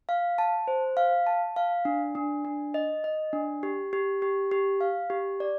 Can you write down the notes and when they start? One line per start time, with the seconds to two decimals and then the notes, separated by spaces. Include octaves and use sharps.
0.09 F5
0.38 A5
0.68 C5
0.97 F5
1.27 A5
1.56 F5
1.85 D4
2.15 D4
2.45 D4
2.74 D#5
3.04 D#5
3.33 D4
3.63 G4
3.93 G4
4.22 G4
4.51 G4
4.81 F5
5.10 G4
5.40 D5